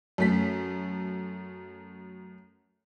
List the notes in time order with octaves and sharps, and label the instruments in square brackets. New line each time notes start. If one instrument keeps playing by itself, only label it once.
[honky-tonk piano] F#2 A3 B6